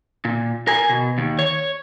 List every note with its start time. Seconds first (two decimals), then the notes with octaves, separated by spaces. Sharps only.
0.25 A#2
0.67 A#4 G#5
0.89 B2
1.18 D#2
1.39 C#5